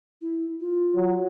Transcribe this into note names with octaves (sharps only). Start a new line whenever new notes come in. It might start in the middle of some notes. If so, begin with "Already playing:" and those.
E4
F4
F#3